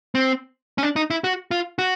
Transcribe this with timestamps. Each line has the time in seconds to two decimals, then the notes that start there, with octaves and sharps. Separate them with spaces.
0.15 C4
0.78 C#4
0.83 D4
0.96 D#4
1.10 E4
1.24 F#4
1.51 F4
1.79 F#4